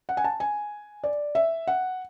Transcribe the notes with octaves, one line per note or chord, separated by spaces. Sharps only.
F#5
G#5
A5
G#5
D5
E5
F#5